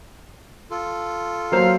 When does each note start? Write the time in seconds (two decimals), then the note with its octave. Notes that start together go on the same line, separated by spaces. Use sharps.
0.71 F4 A4
1.52 F#3 A#3 C5 F5